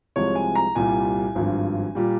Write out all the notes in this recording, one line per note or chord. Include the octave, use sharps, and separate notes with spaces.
C2 C3 F3 G#3 C#5
G#5
A#5
C2 A#2 G3 G#5
G#1 G2 F3
A#2 G3